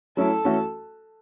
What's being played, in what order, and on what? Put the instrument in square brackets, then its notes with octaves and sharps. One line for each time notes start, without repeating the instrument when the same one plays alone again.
[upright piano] F#3 A3 C#4 E4 [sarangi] A4
[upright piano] E3 A3 C#4 F#4